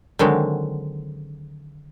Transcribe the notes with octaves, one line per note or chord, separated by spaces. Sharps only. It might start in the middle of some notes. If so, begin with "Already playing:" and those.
D3 D#3 F#3 G#3 C4